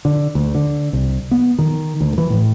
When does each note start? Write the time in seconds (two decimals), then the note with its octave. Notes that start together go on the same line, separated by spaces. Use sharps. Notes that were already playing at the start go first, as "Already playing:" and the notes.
0.05 D3
0.35 D2
0.55 D3
0.93 C2
1.31 B3
1.59 D#3
2.01 D2
2.18 E3
2.30 A2